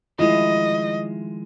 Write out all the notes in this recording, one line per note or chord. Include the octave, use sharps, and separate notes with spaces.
D#3 F3 G#3 A3 E4 F4 D#5